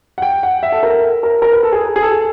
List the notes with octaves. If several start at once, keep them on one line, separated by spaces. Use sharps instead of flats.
F#5
G5
F#5
E5
A4
A#4
A#4
A#4
B4
A4
G#4
G#4
A4